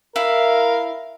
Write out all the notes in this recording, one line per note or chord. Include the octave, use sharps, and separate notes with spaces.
E4 A#4 F5